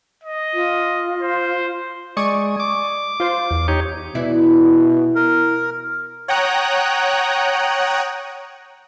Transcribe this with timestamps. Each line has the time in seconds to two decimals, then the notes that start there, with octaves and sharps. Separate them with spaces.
0.24 D#5
0.54 F4
1.22 C5
2.17 G#3 D5 C#6 D#6
2.60 D6
3.20 F4 C5
3.51 E2
3.68 D#4 G4 C#5
4.15 B2 E3 E4 D5
5.15 A#4
6.28 C#5 F#5 G5 A#5 D#6 F#6